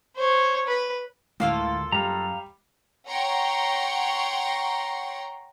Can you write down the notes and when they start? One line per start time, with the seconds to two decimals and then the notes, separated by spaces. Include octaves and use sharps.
0.16 C5 C#5
0.67 B4
1.40 D2 A2 D3 G#3 A#3 F4 A4
1.92 F#2 G3 F5 A#5
3.10 C#5 F#5 G5 A#5 C6 C#6